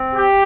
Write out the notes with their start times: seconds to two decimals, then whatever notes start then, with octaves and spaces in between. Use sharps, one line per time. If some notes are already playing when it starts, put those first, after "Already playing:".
Already playing: C4
0.14 G4